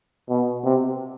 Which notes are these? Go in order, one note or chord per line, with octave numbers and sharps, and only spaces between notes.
B2
C3